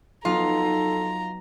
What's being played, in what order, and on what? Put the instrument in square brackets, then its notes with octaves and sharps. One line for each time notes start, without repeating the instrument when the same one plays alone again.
[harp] F#3 B3 D#4 [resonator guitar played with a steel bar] F4 [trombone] A4 [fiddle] A#5